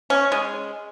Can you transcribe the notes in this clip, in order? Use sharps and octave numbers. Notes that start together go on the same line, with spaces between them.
C#4
G#3